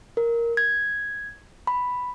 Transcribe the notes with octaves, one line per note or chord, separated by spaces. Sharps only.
A#4
G#6
B5